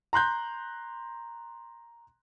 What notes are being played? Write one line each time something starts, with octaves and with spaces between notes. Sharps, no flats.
A#5 C6 F#6 G6